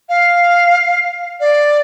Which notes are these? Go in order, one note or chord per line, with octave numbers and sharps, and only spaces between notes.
F5
D5